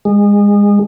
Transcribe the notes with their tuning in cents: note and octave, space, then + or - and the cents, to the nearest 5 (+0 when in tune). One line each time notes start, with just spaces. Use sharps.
G#3 -25